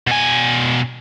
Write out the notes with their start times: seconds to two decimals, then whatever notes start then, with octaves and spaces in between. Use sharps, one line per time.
0.07 B2 G#5